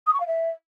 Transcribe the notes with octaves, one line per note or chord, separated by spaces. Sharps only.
D#6
C#6
F5
E5